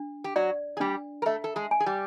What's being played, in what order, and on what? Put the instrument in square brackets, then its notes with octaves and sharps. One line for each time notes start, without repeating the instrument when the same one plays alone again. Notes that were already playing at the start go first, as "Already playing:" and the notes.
Already playing: [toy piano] D4
[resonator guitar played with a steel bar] G4
[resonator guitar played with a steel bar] F#3 F#4 [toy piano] D5
[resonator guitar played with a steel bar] G#4
[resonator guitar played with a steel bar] G3 G4 [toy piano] D4
[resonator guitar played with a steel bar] A#4
[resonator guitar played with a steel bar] A3 A4 [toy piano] E5
[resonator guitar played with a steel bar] A4
G#3 G#4
[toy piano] G#5
[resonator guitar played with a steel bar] G#4
G3 G4